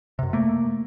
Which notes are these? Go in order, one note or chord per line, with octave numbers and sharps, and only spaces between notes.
F#2 C3
A3 A#3